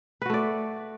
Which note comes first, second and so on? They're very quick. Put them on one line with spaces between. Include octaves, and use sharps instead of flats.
B4 F#4 A3 D5